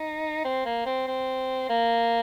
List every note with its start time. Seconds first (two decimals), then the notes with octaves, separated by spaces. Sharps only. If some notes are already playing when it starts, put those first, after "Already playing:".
Already playing: D#4
0.45 C4
0.65 A#3
0.86 C4
1.07 C4
1.69 A#3